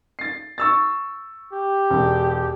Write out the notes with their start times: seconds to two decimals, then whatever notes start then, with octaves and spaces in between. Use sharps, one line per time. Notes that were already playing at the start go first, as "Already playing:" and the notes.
0.19 A6 C7
0.58 C#6 E6 A6
1.53 G4
1.90 E1